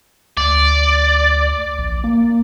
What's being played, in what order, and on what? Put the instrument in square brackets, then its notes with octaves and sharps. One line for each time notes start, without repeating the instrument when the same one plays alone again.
[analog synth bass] D2 [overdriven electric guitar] D5
[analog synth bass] A#1
A#3